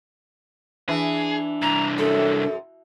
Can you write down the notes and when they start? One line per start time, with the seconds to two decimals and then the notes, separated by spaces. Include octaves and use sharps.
0.89 E3 D4 G#4
1.62 C2 E3 A#5
1.98 F#2 A4